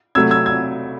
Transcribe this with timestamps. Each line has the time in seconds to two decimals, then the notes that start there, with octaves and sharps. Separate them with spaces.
0.15 C3 F#3 A3 E6 G#6
0.31 E6 G#6
0.46 E6 G#6